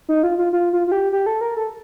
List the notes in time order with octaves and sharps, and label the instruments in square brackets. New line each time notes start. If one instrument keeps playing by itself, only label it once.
[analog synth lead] D#4
F4
F4
F4
F4
F4
G4
G4
A4
A#4
A4